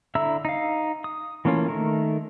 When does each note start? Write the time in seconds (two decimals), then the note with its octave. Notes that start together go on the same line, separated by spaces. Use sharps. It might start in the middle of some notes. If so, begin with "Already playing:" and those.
0.15 D3 E4 E5 A#5 E6
0.45 D#4 F5
1.04 D#6
1.45 E3 A3 A#3 C#4 F4
1.68 D#3 A3 A#4